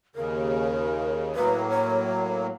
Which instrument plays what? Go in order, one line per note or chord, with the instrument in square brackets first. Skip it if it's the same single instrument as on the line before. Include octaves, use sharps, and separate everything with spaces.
[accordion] D#2 C#3 [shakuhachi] A#4
[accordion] A2 F#3 A#3 [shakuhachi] B4
[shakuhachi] C#5